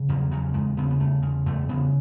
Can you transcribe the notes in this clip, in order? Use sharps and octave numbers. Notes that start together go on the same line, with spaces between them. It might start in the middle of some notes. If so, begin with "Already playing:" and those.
Already playing: C#3
E2 F#3
C#3 F#3
E2 G#3
C#3 B3
B3
E2 A3
C#3
E2 A3
C#3 B3